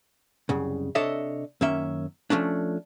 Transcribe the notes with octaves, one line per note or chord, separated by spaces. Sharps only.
C2 F#2 C#3
C3 D4 A4 C#5 D#5 E5
F#2 D#3 A#3 C#4 E5
F3 A3 C#4 D4